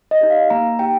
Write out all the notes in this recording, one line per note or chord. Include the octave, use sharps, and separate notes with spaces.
D#5
D#4 G4
F5
A#3 A#5
D#4 G4 G5